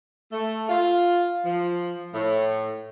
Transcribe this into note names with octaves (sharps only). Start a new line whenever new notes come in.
A3
F4
F3
A2